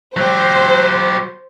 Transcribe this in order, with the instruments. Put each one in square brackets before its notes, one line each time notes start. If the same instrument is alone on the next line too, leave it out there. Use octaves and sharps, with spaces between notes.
[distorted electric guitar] F#3 G4 [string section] C5